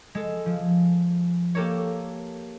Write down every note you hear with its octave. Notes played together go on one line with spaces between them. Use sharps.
G#3 A4
F3
A#3 G4 A4 A#4 C#5